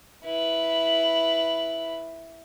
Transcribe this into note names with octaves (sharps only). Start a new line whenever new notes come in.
E4 B4